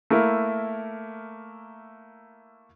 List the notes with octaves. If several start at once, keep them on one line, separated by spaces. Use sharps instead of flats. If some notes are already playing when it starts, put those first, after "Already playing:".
A3 A#3 E4 A#4